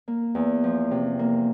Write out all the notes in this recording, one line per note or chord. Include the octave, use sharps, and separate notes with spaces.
A#3
E2
F3
C3
A#3